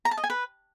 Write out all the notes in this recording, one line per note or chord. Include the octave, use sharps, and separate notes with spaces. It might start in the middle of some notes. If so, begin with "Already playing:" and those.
A#5
A5
D#5
G#5
B4